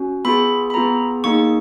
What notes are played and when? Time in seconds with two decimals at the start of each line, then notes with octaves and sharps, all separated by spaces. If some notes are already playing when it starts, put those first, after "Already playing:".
Already playing: C#4 F#4
0.25 B3 F4 G#4 B5
0.70 B5
0.74 B3 F4 G#4 A#5
1.24 A#3 D#4 G#4 C#6